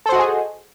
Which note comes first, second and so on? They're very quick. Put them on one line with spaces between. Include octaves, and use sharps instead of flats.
A4 C5 F#4 D#5 G#4